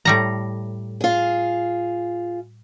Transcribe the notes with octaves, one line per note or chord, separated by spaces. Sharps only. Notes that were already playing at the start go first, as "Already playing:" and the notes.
A2 G3 A#5
F4 G#4